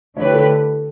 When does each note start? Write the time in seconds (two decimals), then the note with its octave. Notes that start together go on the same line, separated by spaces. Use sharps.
0.16 D3 A3 E4 G4 B4 C#5
0.34 A4